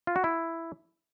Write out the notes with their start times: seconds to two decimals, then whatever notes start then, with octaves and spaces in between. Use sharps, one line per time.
0.07 F4
0.16 F#4
0.24 E4